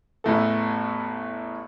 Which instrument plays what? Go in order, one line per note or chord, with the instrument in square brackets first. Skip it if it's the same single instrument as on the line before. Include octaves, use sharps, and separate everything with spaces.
[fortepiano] A1 E2 A2 A4